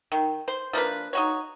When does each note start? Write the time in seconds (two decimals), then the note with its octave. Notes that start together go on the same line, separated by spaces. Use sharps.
0.12 D#3
0.48 C5
0.73 F3 A#3 D4 B4
1.13 D#4 F#4 C#5